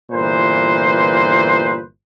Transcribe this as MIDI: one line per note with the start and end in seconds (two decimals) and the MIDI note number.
0.11 1.82 31
0.11 1.82 46
0.11 1.82 52
0.11 1.82 71
0.11 1.82 72